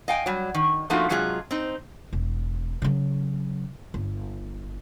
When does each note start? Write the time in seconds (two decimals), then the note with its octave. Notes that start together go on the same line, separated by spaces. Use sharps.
0.08 D#5 F5 G5 G#5
0.26 F#3 G3
0.54 D#3
0.90 F3 A3 A#3 D#4 F4 F#4
1.09 C3 F#3 G#3 F4 G#4
1.51 C4 D#4
2.13 E1
2.82 C#3 F#3
3.94 G1